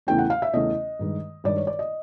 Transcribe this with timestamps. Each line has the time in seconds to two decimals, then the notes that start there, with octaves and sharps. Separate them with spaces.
0.07 E2 C#3 E3 A3 C#4 G5
0.19 F#5
0.30 F5
0.42 E5
0.53 E2 C#3 E3 A3 C#4 D#5
0.99 G2 D#3 G#3
1.44 G2 D#3 G#3 D5
1.56 C#5
1.67 D5
1.79 D#5